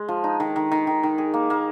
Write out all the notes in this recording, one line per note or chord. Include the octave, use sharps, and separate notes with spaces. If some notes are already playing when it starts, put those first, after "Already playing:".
Already playing: G#3
F3
D#4
D#3
D#3
D#3
D#3
D#3
G#4
A#3
A#3